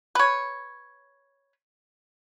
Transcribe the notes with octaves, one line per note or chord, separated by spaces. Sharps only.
B4 C#5